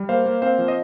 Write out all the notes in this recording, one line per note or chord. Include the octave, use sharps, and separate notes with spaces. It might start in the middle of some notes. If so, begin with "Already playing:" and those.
Already playing: G3
A#3 C5 F5
A#3
C4 C5 F5
F3
D#5